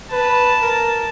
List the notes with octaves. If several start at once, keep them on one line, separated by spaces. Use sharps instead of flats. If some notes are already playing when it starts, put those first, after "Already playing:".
B4 A5
A#4